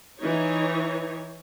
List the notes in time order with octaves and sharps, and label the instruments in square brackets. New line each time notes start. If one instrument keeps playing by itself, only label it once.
[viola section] E3 D#4 C#5